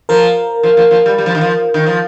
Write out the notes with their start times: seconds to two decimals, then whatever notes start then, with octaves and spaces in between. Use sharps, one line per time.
0.09 F3 A#4
0.63 F3
0.77 F3
0.91 F3
1.06 G3
1.18 G3
1.26 F3
1.35 D#3
1.41 F3
1.74 D#3
1.86 F3